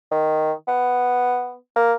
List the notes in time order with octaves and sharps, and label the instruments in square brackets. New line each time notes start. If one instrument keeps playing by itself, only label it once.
[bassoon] D#3
B3
A#3